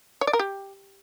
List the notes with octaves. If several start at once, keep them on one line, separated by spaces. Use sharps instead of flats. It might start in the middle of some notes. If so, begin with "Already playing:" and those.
C#5
D5
A#4
G4